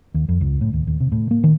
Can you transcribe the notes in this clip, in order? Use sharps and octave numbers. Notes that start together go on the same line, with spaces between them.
D#2
F2
C#2
A2
D#2
D#2
C3
A2
A#3
D#3